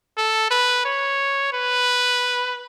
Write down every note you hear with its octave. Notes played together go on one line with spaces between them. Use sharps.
A4
B4
C#5
B4